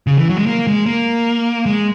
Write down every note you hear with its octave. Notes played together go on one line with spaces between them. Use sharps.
C#3
E3
F#3
G#3
A#3
G#3
A#3
G#3